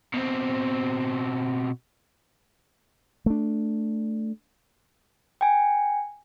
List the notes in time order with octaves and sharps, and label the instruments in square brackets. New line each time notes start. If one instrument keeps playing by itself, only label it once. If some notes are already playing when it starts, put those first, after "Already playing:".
[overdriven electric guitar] B2 C4
[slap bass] A3 D4
[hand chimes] G5 G#5